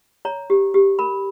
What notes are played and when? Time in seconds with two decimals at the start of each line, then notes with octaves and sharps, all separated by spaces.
0.25 C#5 A#5
0.50 G4
0.74 G4
0.99 A#4 B5